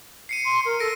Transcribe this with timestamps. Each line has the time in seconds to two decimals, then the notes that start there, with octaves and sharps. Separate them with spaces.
0.29 C7 C#7 D#7
0.45 C6
0.66 A#4
0.80 A4 A#6 D7